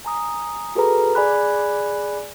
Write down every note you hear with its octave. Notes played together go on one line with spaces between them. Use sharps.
G#5 A#5 D#6
F#4 G#4 A4 B4 A#5
G#4 D5 G#5 B5 F#6